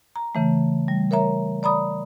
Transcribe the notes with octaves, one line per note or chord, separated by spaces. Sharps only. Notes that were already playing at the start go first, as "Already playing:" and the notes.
A#5
C#3 E3 A3
G3
A#4 C#5 E5 A#5
D5 A#5 B5 D#6